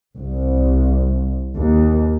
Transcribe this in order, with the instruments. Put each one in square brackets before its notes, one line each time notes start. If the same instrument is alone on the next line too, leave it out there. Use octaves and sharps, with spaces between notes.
[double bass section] C2
D#2